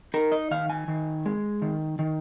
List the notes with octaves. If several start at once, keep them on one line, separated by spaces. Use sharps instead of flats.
D#4 A#4
D#5
D#3 F5
G#5
D#3
G#3
D#3
D#3